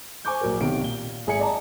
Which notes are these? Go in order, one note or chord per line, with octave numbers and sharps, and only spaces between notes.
C5 G#5 C#6 D6 G6
A#1 F#3 A#4
B1 C3 D#3 D7
A#2 G7
G#1 G#4 E5 G#5 C#7
D5 D#5 A5 A#5